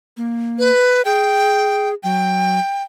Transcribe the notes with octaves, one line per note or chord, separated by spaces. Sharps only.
A#3
B4
G#4 G5
F#3 G5